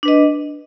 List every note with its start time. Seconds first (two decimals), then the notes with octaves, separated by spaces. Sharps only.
0.03 D4
0.05 B4
0.08 D#5